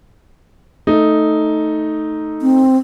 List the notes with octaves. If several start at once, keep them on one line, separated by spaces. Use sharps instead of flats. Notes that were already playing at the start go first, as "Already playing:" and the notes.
A3 D#4
C4